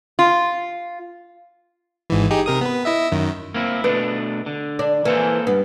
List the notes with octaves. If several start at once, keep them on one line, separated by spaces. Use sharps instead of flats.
F4
G#1 G#2 E3
D#4 G4 G#4
C3 A#4 D#6
B3 B4
E4 D#5 E5
F#2 D#3
A#3 C4 E4
B2 A3 D4 B4
D3
D4
E3 A#3 A4 C5
G2 B3